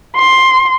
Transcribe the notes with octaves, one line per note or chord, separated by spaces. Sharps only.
C6